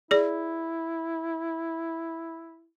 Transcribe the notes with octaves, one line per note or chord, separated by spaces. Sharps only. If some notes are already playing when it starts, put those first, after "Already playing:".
E4 G#4 D5